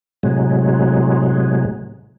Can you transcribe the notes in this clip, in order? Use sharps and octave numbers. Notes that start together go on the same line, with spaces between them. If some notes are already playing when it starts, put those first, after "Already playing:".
A2 C3 F#3 G#3